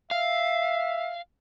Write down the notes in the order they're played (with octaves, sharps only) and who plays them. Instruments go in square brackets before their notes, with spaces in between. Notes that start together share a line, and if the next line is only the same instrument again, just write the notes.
[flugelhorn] E5 [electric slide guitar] F5